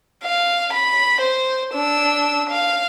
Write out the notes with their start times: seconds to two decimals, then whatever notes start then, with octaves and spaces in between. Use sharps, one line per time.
0.24 F5
0.73 B5
1.21 C5
1.74 D4 E6
2.50 F5